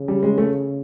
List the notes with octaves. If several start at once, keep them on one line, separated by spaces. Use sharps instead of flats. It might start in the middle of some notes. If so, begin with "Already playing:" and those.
Already playing: C#3
G3
G#3
A3